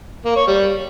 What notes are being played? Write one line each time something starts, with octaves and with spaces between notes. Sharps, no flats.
A#3
C#5
G3